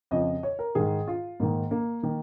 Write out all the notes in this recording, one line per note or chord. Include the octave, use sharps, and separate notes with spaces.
F2 C#3 F3 D#5
C#5
A#4
G#2 D#3 G#4
F4
G#2 D#3 A#3
A#3
D#3 A#3